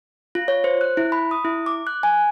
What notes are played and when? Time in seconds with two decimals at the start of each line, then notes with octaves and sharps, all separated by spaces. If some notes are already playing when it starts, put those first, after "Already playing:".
0.35 F4
0.48 C#5
0.64 C5
0.81 F#6
0.97 E4
1.12 B5
1.31 D#6
1.45 E4
1.66 D6
1.87 F#6
2.03 G#5